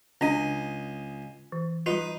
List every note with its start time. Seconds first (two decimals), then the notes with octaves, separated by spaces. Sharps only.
0.21 C#2 C#4 D4 D#5 G#5
1.52 E3
1.86 G3 D#4 F4 B4